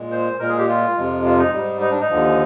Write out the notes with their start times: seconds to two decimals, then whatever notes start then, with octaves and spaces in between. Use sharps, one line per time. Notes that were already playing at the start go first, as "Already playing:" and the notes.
Already playing: A#2 G#3
0.12 C5
0.39 A#2 G#3 A#4
0.49 G#4
0.58 G4
0.68 F4
0.97 F2 C3 F3 G#3
1.25 F4
1.39 D#4
1.53 G#2 G3
1.81 D#4
1.91 D4
2.01 D#4
2.10 D#2 D3 F3